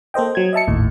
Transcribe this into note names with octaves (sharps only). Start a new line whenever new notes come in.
A#3 A4 C5 D#5 G5
F#3 G#6
D#5 E5 A5 C#7
G#1 D#2 A2